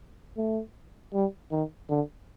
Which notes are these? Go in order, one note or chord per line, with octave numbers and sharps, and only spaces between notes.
A3
G3
D#3
D3